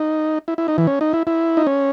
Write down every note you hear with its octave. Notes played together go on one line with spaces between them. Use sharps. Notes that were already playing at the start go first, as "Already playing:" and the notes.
Already playing: D#4
E4
E4
D#4
E3
C#4
D#4
E4
E4
D#4
C#4